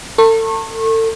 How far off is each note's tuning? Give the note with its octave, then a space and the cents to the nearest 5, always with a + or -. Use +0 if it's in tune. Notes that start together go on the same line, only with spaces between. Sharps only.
A4 +35 C#6 -30